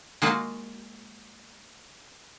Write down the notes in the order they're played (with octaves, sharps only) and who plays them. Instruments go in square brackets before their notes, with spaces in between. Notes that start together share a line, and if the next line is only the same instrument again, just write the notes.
[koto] G#3 A#3 F4 F#4